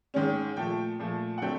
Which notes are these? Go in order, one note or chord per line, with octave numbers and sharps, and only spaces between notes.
G#2 D#3 G#3 C#4
A#2 F3 A3 G5
A#2 F3 A3
F#5
D3 F#3 A3 C4 G5